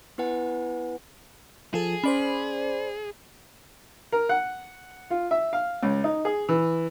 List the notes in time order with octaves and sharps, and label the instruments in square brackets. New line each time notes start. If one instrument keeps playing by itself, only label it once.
[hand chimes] B3 E4 B4 F#5 G#5
[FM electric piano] F3 A4 [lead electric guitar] G#4
[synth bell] C#4 F#7 [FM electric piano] C5 D5 B5
[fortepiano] A#4
F#5
F4
E5
F5
C#2
D#4
G#4
E3